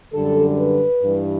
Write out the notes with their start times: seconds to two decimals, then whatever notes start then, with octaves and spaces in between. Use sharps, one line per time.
0.14 F#2 D3 G3 A4
0.59 B4
1.04 G2 E3 G3